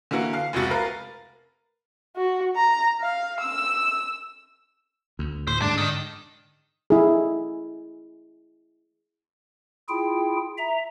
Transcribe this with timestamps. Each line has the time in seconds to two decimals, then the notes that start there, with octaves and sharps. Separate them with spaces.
0.11 D3 E3 A#3 F#4
0.33 F5
0.53 F1 C#2 C3 F#4 A6
0.70 A#4 B4 F5
2.16 F#4
2.56 A#5
3.00 F5
3.40 E6
5.19 D2
5.47 A2 C5
5.62 G#2 D3 D4
5.78 D#3
6.90 E4 G#4
9.89 E4 F4 G#4 G5
10.58 E5 A#5